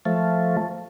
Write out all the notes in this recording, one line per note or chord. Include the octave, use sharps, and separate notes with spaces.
F3 A3